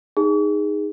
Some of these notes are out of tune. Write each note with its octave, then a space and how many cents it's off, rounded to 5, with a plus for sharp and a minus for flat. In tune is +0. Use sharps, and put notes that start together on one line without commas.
D#4 +0 G#4 -15